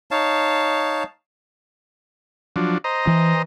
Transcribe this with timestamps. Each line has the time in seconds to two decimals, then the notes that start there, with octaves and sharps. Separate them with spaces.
0.11 D#4 C#5 F5 A5
2.56 F3 F#3 D4
2.84 C5 D#5 A#5
3.07 E3